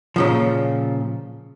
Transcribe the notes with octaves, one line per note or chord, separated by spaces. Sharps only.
A#2 C#3 F3